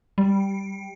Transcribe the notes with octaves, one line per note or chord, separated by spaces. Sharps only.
G3